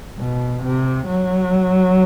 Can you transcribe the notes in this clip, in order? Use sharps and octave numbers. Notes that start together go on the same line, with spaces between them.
B2
C3
F#3